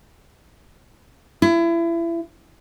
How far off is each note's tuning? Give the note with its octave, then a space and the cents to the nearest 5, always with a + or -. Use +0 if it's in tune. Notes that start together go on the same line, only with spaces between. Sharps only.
E4 +30